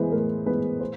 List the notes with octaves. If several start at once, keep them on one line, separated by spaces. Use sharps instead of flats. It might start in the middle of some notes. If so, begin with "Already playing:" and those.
Already playing: E3 G#3 B3 B4 C5
A2 A#4
E3 G#3 B3 B4
C5